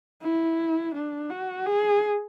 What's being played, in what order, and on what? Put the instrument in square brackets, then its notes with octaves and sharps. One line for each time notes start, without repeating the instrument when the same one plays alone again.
[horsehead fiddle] E4
D4
F#4
G#4